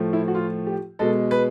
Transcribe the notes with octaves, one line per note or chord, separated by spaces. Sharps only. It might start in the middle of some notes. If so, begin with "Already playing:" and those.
Already playing: A2 F3 A3
E4
F#4
F4
G4
B2 G#3 A4
B4